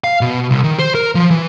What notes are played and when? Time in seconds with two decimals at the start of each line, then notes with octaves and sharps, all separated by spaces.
0.04 F5
0.21 B2
0.51 C2
0.64 D#3
0.79 C5
0.95 A#4
1.15 F3
1.31 E3